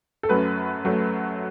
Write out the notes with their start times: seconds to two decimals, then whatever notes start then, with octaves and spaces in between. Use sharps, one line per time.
0.23 A4
0.29 F#2 F#3 A3 B4
0.85 F#3 A3